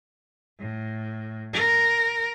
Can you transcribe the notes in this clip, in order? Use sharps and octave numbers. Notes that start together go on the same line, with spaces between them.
A2
A#4